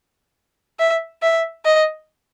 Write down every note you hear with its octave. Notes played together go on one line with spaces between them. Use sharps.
E5
E5
D#5